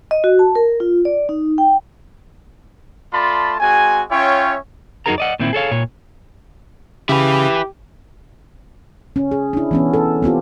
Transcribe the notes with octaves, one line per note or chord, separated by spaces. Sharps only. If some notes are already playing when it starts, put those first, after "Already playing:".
D#5
F#4
A5
A#4
F4
D5
D#4
G5
A3 F4 D5 A5 B5 C6
G#3 C4 F#4 G#5
C#4 F4 C#5 E5 G5
F#2 D#4 F#4 G#4 A#4 A#5
D5 D#5 F#5
A#2 D#3 C4 E4
G#4 A4 C#5 F5
A#2 C#5
C#3 E4 G4 B4
C#4
G#4
D4 E4
E3 B3 C#4
A4
B3 C4 F4 G4